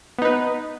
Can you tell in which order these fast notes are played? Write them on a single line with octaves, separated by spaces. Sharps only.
B3 D#4 B4